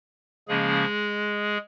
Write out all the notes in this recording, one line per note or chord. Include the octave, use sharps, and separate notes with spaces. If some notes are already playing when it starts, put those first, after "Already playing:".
C#3 F3 G#3 A#3 C#4 G#4